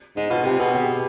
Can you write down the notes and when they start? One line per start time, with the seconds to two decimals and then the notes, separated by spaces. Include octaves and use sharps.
0.16 G#2 D#4
0.30 B2 F4
0.45 C3 G4
0.59 B2 G#4
0.74 G4